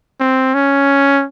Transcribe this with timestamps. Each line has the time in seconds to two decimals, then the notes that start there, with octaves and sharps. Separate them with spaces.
0.20 C4
0.54 C#4